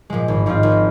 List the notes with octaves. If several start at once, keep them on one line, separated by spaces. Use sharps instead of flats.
A#2 F3 G#3
G#1
G#2 F3 C4 F4
G#1